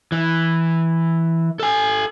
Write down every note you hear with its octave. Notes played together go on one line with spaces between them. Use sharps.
E3
A4 G#5